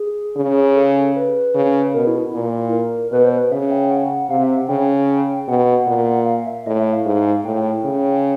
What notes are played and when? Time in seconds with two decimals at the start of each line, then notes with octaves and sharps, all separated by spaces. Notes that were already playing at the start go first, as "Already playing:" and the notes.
Already playing: G#4
0.37 C#3
0.76 A4
1.16 B4
1.55 C#3
1.94 B2 A#4
2.07 E4
2.20 E4
2.34 A#2
2.72 A#4
3.12 B2 B4
3.25 C5
3.38 B4
3.52 C#3 E5
3.71 G5
3.91 F#5
4.29 C3 F5
4.43 E5
4.57 F#5
4.69 C#3 G5
5.48 B2 F#5
5.87 A#2
6.26 F5
6.46 E5
6.66 A2 D#5
6.79 E5
6.93 F5
7.05 G#2
7.45 A2 G5
7.85 C#3